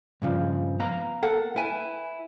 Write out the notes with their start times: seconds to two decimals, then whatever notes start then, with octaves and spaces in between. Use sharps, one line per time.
0.22 G2 C#3 F3
0.79 B3 F5 A#5
1.23 A4 A#4 F#5
1.56 E4 B4 G#5